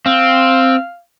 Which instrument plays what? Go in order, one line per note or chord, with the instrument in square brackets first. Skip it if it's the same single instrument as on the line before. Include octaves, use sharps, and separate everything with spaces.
[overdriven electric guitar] C4 [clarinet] F5